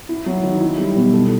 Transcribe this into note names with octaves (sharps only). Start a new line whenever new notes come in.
E4
F#3
D#3
E4
G3
B2
A4